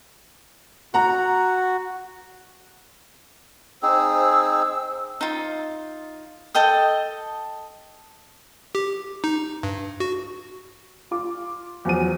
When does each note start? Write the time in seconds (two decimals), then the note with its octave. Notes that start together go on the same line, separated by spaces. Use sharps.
0.94 F#4 F#5 A#5
3.83 C4 D#4 G#4 C5 E6
5.21 D#4 F4
6.54 A4 D#5 G5 D#6
8.75 G4
9.24 D#4
9.63 G2
10.00 F#4
11.11 F4 D6
11.85 E2 F3 F#3 D#7